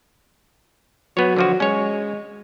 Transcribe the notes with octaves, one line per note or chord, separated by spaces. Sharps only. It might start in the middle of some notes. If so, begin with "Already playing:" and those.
F#3 B3 C#5
D3 F3 F#4
G#3 C#4 C#5